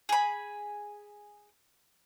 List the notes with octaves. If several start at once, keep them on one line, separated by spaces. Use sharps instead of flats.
G#4 B5